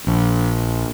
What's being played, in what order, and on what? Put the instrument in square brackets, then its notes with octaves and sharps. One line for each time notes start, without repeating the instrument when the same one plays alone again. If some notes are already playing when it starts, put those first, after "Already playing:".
[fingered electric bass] A#1